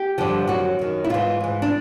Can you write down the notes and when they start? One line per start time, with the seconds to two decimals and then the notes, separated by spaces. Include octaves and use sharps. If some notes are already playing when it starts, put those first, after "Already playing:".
Already playing: G4
0.18 G2 D3 F3
0.47 F#2 D#3 F#4
0.79 F#2 D#3
1.04 E4
1.10 G#2 E3 F4
1.41 G#2 E3
1.62 D4